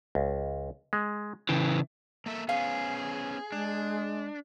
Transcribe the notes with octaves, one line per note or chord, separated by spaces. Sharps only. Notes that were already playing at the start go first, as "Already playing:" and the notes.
C#2
G#3
C#3 E3 G5
A#3 A4 E5
B3 C#4 G#4 F5
G#3 D4